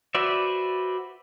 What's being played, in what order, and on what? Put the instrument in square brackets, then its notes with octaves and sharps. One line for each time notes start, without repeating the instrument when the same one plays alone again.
[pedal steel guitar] F#4 B4 C5 D5 E5